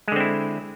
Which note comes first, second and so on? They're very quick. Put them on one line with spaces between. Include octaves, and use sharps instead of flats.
G#3 D3 C4 E4